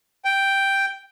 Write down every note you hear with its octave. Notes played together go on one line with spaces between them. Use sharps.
G5